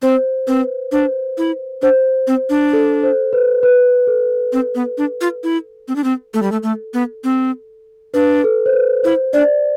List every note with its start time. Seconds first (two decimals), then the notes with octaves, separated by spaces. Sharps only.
0.02 C4 C5
0.47 C4 B4
0.92 D4 C5
1.38 E4
1.82 D4 C5
2.27 C4
2.50 D4
2.73 A4
3.03 C5
3.33 B4
3.63 B4
4.07 A4
4.53 C4
4.75 B3
4.98 D4
5.21 F4
5.44 E4
5.88 C4
5.96 D4
6.04 C4
6.34 A3 A4
6.42 G3
6.52 A3
6.63 A3
6.94 B3
7.24 C4
8.14 D4 B4
8.44 A4
8.66 C5
8.73 B4
9.03 E4 C5
9.33 D4 D5